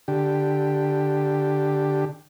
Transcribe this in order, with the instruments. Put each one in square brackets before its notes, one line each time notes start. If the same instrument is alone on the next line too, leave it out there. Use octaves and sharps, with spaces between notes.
[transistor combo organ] D3 G4